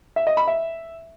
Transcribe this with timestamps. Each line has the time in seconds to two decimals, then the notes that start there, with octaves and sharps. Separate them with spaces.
0.16 E5
0.27 D#5
0.37 B5
0.48 E5